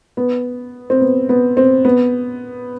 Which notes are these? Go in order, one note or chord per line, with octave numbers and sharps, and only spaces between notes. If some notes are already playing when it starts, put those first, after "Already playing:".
B3
C4
B3
B3
C4
B3